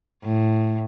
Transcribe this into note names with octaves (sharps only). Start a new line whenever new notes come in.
A2